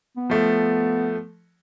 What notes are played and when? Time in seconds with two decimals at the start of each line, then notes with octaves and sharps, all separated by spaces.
0.17 B3
0.30 F3 A3